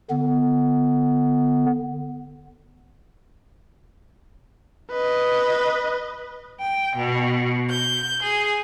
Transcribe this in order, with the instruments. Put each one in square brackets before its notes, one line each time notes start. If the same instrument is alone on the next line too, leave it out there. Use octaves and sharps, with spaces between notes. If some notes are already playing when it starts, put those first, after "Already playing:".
[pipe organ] D3 B3
[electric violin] B4 D#5
[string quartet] G5
B2
G6
G#4